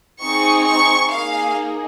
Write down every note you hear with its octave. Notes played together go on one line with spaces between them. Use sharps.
C4 D#4 G#4 C#6
C#6
A#3 D#4 G#4 F5